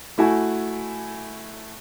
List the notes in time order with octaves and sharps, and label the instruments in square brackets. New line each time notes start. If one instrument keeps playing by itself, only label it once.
[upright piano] A3 E4 F#4 G#5